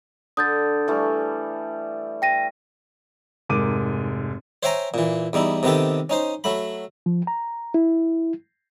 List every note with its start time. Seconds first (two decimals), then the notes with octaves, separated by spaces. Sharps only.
0.37 D3 D#6 G6 A6
0.88 E3 G3 A3
2.22 G5 A#6 D#7
3.49 F1 G#2 A#4 D6 D#7
4.63 C5 C#5 E5 G5 G#5 A#5
4.94 A#2 E3
5.33 E2 G3 D#4 E4
5.63 C3 D#3 B3 G4 A4
6.10 C#4 D#4 C5
6.44 F#3 A3 B5
7.06 F3
7.27 A#5
7.74 E4